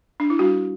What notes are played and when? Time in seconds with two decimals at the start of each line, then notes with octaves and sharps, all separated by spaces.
0.20 D4
0.30 E4
0.39 G3 D4 F#4